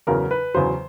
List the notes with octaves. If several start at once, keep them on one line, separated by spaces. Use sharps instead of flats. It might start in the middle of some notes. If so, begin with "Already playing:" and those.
E2 C#3 F#3 A#4
B4
E2 C#3 F#3 C5